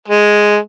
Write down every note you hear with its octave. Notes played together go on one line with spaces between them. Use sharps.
G#3